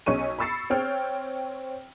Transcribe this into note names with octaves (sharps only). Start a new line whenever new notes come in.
B1 C#4 C#6 D#7
B5 C#6 E6 A6 C7 C#7
C4 C#5 G5 F6